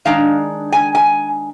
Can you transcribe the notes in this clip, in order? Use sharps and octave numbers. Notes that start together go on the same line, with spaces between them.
D#3 G#3 D4 F5
G#5
G#5